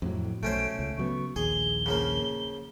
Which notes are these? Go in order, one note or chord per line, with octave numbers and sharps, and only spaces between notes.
F2 A2 F#3
B1 A3 C#4 C5 D7
C#2
C#3 F#3 B3 C#6
A#1 D#2 G#4 G7
C#3 F3 A#3